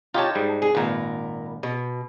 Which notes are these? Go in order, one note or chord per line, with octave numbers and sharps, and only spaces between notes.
D#4 F4 G4 C#5 A5
G#2 G3
G#4
G#1 A#2 A#4 B4
B2